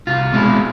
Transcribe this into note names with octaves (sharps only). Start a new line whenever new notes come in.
C2 F4
B2 G#3 C4 E4